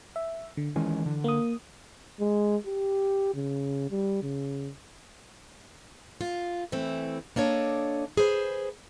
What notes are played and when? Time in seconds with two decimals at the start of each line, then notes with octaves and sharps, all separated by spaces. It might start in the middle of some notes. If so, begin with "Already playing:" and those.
0.16 E5
0.57 D3
0.76 D#3 E3 G#3 C#4
1.06 D3
1.24 A#3 D#6
2.20 G#3
2.67 G4
3.34 C#3
3.90 G3
4.23 C#3
6.21 F4
6.72 E3 A3 C4
7.36 A#3 D4 A4 C#5 D#5
8.17 G#4 B4 C5